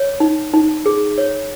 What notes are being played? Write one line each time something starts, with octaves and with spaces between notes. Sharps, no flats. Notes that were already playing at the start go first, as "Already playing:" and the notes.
Already playing: C#5
D#4
D#4
G#4
C#5